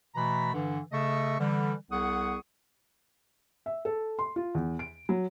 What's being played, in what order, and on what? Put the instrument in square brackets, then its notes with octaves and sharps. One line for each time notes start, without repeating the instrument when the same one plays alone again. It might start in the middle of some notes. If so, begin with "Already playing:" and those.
[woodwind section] B2 E3 A3 A#5 B5
G2 D3 E3
C#3 A3 A4 D#5 E5 C#6
D3 E3 G3
C2 B3 G#4 F#5 C#6 D#6
[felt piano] E5
A4
C6
F4
E2
D7
F#3